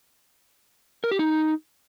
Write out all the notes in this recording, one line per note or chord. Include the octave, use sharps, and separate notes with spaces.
A#4
G4
D#4